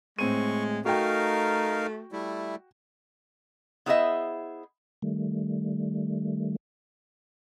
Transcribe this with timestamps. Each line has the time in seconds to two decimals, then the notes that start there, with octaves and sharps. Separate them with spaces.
0.19 A2 G#3 C4 C#6 D#7
0.85 A3 D#4 F#4 A#4 F5 G5
2.12 G3 A3 E4
3.86 B3 E4 G#4 C5 D#5 E5
5.02 D#3 G3 A3